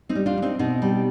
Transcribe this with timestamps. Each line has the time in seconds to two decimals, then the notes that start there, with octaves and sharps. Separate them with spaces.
0.09 C4 D#4
0.15 G3
0.26 D4 F4
0.37 G3
0.42 C4 D#4
0.59 B2 C4 D#4
0.82 G3